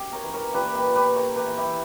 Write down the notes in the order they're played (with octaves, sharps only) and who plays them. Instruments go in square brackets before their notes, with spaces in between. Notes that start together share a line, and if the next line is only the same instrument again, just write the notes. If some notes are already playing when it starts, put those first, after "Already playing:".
Already playing: [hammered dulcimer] F#2 G4
A#4 C#5
E3
A#4 C#5
A#2 G4 B4
G4 B4
A#2
G4 B4
E3 A#4 C#5
G4 B4
E3
E4 G4